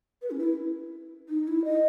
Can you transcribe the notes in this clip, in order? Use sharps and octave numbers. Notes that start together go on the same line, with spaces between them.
B4
C#4
E4
D#4
E4
D#5